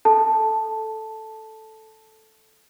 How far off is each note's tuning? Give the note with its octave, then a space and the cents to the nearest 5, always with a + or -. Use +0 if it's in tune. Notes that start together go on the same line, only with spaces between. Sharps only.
A4 +0 A5 -5